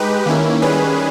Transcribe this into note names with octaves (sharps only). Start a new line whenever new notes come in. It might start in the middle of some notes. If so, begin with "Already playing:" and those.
Already playing: G#3 D#4 G4 B4
D#3 A#3 C#4 E4
D#3 G3 C#4 G#4 B4